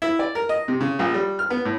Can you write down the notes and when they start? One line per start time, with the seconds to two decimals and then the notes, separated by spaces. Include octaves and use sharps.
0.02 E4
0.19 D5
0.35 A#4
0.49 D#5
0.68 C3
0.81 C#3
0.99 A#1
1.14 G3
1.39 F6
1.50 B3
1.65 A2